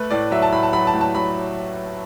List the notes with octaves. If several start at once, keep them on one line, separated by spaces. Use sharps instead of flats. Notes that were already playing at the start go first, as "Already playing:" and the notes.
Already playing: A3 B4
A2 D5
F#3 E5
A5
A2 B5
A5
F#3 B5
A5
A2
A5
F#3 B5